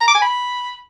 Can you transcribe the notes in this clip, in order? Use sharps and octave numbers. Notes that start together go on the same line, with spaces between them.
A#5
D6
G#5
B5